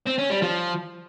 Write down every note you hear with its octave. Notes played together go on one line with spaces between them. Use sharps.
C4
C#4
G3
F3